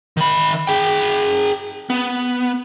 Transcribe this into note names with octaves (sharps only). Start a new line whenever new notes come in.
D#3 B5
G#4 G5
B3